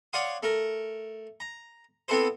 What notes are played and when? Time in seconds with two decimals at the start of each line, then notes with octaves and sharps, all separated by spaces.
0.13 C#5 D5 F5 F#5 C6 D#6
0.43 A3 A#4
1.40 A#5
2.08 B3 C4 E4 A4 B4 C5